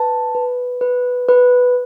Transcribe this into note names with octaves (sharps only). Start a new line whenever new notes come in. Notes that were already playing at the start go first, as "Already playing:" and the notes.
Already playing: B4 A5
B4
B4
B4